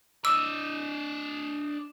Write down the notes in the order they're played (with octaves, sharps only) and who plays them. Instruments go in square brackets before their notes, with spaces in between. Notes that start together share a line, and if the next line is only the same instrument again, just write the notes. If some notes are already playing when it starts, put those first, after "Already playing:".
[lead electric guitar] D4 D#5 [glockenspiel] D6 E7 [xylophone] E6